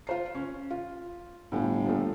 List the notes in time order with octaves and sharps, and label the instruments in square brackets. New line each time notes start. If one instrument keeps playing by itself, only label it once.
[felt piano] F4 C5 C7
C#4
F4
[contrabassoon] G1 [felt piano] A2
[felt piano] A#2 F3 A3